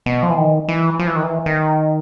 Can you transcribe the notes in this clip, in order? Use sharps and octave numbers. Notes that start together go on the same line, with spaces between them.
B2
F3
E3
D#3
E3
F3
E3
D#3
E3
D#3